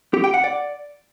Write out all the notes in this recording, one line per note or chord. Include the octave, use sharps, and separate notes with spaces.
G4
G5
F#5
D5